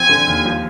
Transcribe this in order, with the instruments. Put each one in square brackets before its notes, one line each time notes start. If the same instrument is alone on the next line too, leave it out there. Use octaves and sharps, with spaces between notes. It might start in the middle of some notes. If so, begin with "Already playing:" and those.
Already playing: [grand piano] F3 C4 [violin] G#5
[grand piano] D3
D#2
F3